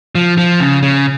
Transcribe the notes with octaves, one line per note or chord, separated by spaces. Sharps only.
F3
F3
C#3
C#3